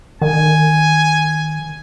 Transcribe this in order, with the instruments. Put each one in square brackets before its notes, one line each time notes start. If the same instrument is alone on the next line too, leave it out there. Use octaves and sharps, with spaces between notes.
[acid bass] D#3 [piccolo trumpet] G#5